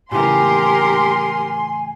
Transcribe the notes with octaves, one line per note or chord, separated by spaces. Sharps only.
A2 C#3 E3 G4 A#4 G#5 C6